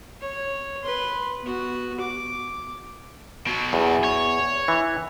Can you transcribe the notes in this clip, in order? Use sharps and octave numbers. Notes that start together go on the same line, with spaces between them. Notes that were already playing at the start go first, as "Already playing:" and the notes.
C#5
B4 C6
B3 F#4
D6
B2 F#3
E2
C#5
E3